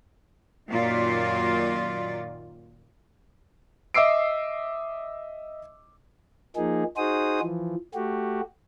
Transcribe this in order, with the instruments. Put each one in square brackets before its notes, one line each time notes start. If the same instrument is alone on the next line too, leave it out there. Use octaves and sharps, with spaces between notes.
[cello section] F#2 A#2 D#3 F#3 F4 D5
[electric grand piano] D#5 E5 D6 E6 C7 D7
[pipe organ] F3 A#3 D#4 G#4
D#4 F#4 G#4 C5 D#6
E3 F3
A3 F#4 G4